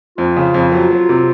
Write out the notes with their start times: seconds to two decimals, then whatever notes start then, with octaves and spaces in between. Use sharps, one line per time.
0.18 F2 F4
0.36 C#3
0.54 F2
0.72 F#3
0.90 F#3
1.09 C3